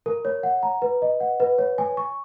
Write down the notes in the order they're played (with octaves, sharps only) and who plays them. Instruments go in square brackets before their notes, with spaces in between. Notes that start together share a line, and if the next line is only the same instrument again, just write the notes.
[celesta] A#4
C#5
F#5
A#5
B4
D#5
F#5
B4
C#5
G#5
C#6